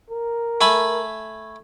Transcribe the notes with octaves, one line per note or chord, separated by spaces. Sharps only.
A#4
A3 G#5 B5